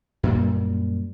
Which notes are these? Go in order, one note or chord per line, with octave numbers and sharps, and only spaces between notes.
F#2 A#2 G3